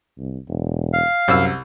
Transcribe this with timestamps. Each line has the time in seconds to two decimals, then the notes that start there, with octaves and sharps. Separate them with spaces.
0.18 C2
0.48 E1
0.93 F5
1.28 C2 F#2 E6